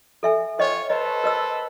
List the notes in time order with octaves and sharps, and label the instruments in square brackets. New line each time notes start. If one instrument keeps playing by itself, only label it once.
[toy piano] A4 E5 G#5
[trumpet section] F4 C#5 [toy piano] C5 D#5 G5
[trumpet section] A4 B4 C5 [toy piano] D#5
[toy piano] A#4 D#5 E6